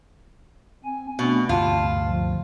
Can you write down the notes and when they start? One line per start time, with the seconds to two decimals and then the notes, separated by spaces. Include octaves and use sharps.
0.85 C4 G#5
1.19 B2 A3 B3 D4
1.49 D2 G2 C3 F4 A5
2.05 F3